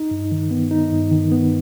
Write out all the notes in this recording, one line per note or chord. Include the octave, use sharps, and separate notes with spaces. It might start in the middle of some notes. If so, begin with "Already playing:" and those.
Already playing: D#4
G2
D#3
B3
D#4
G2
D#3
B3